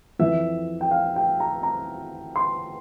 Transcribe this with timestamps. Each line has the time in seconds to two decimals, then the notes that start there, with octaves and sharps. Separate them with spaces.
0.19 F2 E3 E5
0.81 G5
0.91 F5
1.16 G5
1.40 A#5
1.63 A#5
2.36 C6